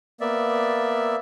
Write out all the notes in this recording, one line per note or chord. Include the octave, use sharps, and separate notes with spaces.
A#3 B3 D5 E5